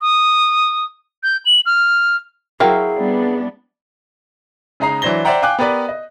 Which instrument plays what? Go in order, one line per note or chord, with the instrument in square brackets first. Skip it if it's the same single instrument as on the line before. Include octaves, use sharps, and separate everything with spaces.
[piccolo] D#6
G6
F#7
F6
[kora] F#3 C4 E4 [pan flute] G#4 [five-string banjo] A#4 F5 G5
[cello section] G3 B3 D4
[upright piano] C#3 G#3 D#4 D#5 A#5 C7
E3 F#3 D4 C5 A#6 G7
C5 D5 E5 F#5 G5 A#5
F5 G5 G#5 D6 F#6
B3 G4 A#4 B4 D5
D#5